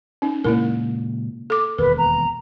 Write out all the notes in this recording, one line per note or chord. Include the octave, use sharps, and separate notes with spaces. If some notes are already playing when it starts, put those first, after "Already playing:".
C#4 D#4
A#2 C#3 G#3 A#3 E4 A#4
A4 D6
E1 D#2 A#4 B4
A#5